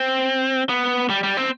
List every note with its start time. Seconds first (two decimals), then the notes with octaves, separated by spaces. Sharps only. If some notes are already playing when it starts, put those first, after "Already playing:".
Already playing: C4
0.69 B3
1.10 G3
1.23 G3
1.37 C4